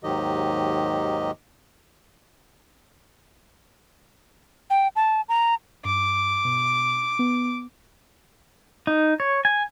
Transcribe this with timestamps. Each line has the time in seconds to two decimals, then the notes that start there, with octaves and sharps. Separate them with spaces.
0.03 D#2 G#2 D#3 F#3 G4 D#5
4.70 G5
4.96 A5
5.29 A#5
5.85 G2 D6
6.45 B2
7.19 B3
8.87 D#4
9.20 C#5
9.45 G#5